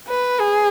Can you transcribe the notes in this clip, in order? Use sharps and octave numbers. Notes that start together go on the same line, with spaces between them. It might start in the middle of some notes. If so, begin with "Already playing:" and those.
B4
G#4